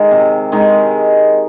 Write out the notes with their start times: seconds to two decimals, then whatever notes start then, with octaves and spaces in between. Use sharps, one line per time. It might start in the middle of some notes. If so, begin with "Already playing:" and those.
Already playing: D#3 G#3
0.11 C3
0.52 D#3 G#3